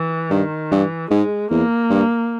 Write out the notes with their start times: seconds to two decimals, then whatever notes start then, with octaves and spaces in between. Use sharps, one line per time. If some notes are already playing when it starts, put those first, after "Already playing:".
Already playing: E3
0.30 G2 D#3
0.71 G2 E3
1.10 G#2 G#3
1.51 E2 A#3
1.90 G2